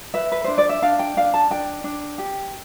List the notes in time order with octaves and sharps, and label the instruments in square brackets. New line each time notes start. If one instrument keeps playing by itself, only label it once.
[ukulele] B4 E5
B4
D4 C5
D5
E5
D4 F5
G5
D4 F5
A5
D4 G5
D4
G4